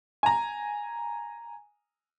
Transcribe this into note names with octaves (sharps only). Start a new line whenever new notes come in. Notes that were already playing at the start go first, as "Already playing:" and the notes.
G#5 A#5